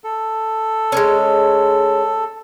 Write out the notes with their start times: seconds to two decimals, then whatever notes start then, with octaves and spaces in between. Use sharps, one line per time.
0.04 A4
0.92 G#3 B3 C#4